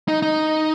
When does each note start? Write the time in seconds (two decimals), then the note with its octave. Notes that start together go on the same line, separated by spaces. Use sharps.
0.08 D#4
0.22 D#4